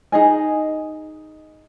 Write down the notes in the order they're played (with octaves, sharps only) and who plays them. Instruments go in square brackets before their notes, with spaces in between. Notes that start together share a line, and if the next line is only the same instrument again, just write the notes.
[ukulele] D#4 G#4 D#5 G#5